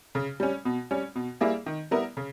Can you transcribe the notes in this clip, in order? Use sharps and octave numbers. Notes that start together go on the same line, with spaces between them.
C#3
G3 C#4
B2
G3 C#4
B2
G3 A#3 E4 G#4
D#3
G3 B3 E4 A#4
C#3